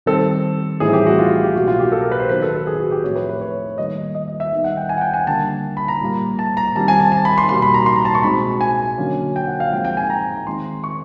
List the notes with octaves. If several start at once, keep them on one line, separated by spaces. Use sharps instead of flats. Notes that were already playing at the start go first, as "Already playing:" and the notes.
D#3 G3 C4 A4
A2 E3 G3 C4 D#4 G#4
G4
F#4
F4
F#4
G4
B2 F#3 A#3 F#4
F4
G4
A4
A#4
B4
C5
D#3 F#3 B3 B4
A4
A4
G#4
F#4
G4
A2 F3 A3 C4 C#5
B4
B4
C#5
D#3 G3 A#3 D#5
D#5
D#5
E5
D#3 G3 B3 D#4
F#5
G5
G#5
F#5
G5
G#5
D3 G3 A#3 A5
B5
A#5
A#2 G3 A#3
A5
A#5
D#3 G3 C4 A5
G#5
A5
A5
B5
C6
B2 G3 A#3 C6
B5
A#5
C6
A#5
A5
C#6
B2 G#3 C4 D#4 B5
G#5
D3 F#3 A#3 C#4
G5
F#5
F5
F3 G#3 C4 G5
G5
G#5
A#5
D#3 G#3 C4 D#4 C6
C#6